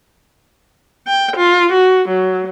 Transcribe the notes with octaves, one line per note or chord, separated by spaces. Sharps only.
G5
F4
F#4
F#3